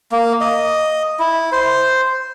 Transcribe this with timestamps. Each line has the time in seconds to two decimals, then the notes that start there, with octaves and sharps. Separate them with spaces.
0.12 A#3
0.41 D#5
1.19 E4
1.52 C5